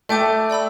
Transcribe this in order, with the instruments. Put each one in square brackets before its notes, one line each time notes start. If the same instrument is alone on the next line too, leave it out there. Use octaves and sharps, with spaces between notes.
[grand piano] A3 [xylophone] E5 G5 D6 G6
[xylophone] D5 G5 B5 E6